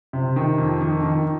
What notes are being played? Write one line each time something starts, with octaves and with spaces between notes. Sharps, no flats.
C3
D#3
F2
D#3
D#3